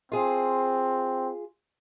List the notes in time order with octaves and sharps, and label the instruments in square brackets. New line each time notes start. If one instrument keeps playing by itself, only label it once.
[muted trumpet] C4 [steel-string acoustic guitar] F4 G#4 F5